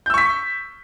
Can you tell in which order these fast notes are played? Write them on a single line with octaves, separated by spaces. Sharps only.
G6 E6 C#6 B6